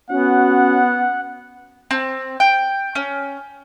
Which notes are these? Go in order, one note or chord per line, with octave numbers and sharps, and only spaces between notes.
B3 C#4 F#4 F#5
C4
G5
C#4